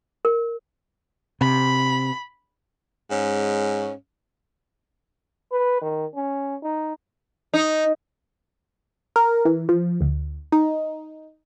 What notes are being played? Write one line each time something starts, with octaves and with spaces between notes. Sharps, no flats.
A#4
C3 B5
G#2 G#3 C#4
B4
D#3
C#4
D#4
D#4
A#4
E3
F3
D2
D#4